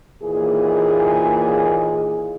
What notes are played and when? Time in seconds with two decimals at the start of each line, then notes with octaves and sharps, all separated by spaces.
0.23 D#2 A#2 E3 G#4